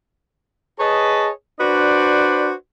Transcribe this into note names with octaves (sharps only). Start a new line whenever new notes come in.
G#4 B4 C#5 D#5 A5
D4 F#4 B4 C5 D5